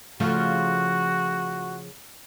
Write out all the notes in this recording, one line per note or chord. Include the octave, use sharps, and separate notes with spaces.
C#3 F3 A3 F#4